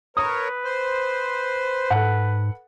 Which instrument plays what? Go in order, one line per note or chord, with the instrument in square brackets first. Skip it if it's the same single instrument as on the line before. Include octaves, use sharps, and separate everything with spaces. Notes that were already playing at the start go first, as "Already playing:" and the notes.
[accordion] A#4 C#5 [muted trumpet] B4 [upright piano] D#6
[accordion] C5
[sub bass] G#2 [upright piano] A4 F#5